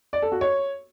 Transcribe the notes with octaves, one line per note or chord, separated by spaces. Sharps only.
D5
A4
F#4
C#5